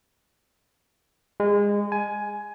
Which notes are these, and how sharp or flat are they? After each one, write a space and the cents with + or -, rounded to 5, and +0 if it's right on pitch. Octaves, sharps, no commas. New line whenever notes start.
G#3 -25
G#5 +15